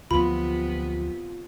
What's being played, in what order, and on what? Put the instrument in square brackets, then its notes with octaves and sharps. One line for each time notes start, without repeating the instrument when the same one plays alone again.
[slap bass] D2 F3 F#3 [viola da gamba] C3 B3 [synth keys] F4 [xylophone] B5